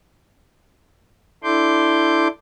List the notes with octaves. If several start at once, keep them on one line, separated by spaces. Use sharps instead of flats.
D4 E4 A4 C6 D6 G6